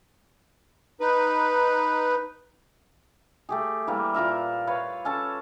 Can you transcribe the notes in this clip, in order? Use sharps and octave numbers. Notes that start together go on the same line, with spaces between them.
D#4 B4
A3 G4 G#4
E3 G3 A#3
A#2 F4 A#4 E5
B4 C#5 F5
C#4 A4 A5